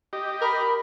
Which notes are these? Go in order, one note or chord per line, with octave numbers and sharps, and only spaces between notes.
G4 D#5
A#4 B5